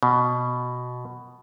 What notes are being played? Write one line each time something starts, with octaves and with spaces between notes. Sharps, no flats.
B2